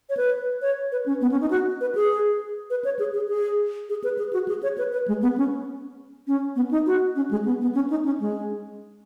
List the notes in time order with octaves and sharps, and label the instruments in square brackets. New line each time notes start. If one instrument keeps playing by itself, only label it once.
[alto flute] C#5
B4
C#5
B4
C#4
B3
C#4
D#4
F#4
B4
G#4
B4
C#5
G#4
G#4
G#4
G#4
B4
G#4
F#4
G#4
C#5
B4
B4
G#3
B3
C#4
C#4
B3
D#4
F#4
C#4
G#3
B3
B3
C#4
D#4
C#4
G#3